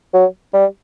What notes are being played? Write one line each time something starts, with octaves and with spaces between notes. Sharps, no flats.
F#3
G3